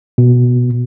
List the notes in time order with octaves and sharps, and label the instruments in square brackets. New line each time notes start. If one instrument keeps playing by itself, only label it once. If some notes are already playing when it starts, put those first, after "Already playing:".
[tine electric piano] B2